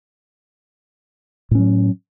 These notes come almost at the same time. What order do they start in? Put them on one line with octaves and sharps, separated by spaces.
A2 C#4 F#3